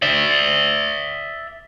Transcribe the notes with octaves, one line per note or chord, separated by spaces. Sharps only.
D5 E5